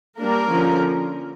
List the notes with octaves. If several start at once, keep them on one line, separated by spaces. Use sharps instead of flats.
G3 A#3 D4 A#4
D3 F3 C#4